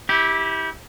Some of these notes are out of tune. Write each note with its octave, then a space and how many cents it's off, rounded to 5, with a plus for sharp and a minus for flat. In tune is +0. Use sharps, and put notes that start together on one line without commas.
E4 -30 G4 +0